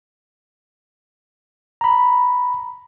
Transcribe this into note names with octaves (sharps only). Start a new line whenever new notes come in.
A#5 B5